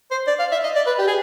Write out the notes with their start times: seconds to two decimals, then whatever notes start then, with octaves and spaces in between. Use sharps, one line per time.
0.11 C5
0.27 D5
0.39 F5
0.52 E5
0.63 D#5
0.75 D5
0.87 B4
0.99 G4
1.07 G#4